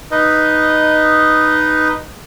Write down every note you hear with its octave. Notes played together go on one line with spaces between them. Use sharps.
D#4 B4 D#5